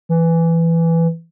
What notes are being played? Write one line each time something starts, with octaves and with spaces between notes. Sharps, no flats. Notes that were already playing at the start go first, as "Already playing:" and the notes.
E3